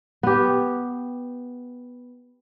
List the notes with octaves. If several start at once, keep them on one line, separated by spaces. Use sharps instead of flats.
B3 G4